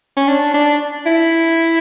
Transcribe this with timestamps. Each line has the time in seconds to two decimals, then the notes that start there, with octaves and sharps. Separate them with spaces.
0.17 C#4
0.28 D4
0.54 D4
1.06 E4